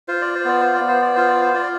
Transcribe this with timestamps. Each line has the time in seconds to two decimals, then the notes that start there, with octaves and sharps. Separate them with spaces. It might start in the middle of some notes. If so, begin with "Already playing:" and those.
0.08 F4 C5
0.21 D5
0.35 C5
0.45 B3 D5
0.61 C5
0.75 D5
0.80 B3
0.88 C5
1.02 D5
1.15 F4 C5
1.28 D5
1.42 C5
1.53 F4 D5